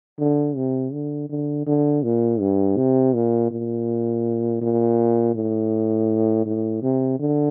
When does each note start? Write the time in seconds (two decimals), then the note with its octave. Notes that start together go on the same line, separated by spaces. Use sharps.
0.19 D3
0.56 C3
0.93 D3
1.30 D3
1.67 D3
2.03 A#2
2.40 G2
2.77 C3
3.14 A#2
3.51 A#2
4.62 A#2
5.35 A2
6.46 A2
6.82 C3
7.20 D3